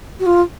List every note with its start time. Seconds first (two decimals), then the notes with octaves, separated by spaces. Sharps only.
0.20 F#4
0.26 F4